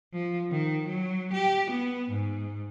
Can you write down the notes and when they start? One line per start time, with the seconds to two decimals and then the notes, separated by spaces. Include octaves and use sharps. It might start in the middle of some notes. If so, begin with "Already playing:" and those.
0.13 F3
0.51 D#3
0.86 F#3
1.33 G4
1.70 B3
2.10 G#2